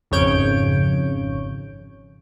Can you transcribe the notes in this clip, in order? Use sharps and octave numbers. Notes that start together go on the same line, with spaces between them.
G#1 F2 C#3 C#5 G6 D7